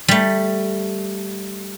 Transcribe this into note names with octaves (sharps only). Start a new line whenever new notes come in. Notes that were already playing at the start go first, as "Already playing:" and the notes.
G3 A3